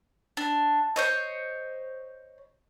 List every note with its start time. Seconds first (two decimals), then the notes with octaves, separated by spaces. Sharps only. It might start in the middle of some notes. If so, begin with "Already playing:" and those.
0.37 D4
0.96 C5 C#5 D#5